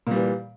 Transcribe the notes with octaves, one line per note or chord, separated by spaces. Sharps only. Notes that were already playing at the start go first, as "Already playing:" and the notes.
A#2 E3 G3